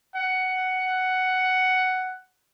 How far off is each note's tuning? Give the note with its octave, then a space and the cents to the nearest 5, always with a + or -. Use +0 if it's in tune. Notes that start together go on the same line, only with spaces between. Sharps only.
F#5 +10